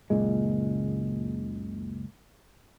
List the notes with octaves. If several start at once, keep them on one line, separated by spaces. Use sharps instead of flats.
F#1 C#2 A#2 G#3